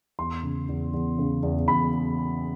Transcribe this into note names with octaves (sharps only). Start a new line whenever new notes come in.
E2 C6
C#3
E2
E2
C#3
E2
E2 B5